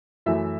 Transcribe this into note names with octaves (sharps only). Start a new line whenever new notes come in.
F#2 E3 A3 E5